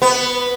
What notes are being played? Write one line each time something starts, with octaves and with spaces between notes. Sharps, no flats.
B3